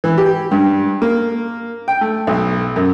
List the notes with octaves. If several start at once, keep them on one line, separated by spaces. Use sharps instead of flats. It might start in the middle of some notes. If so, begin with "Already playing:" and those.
E3
G4
G2
A#3
G5
A3
B1
F#2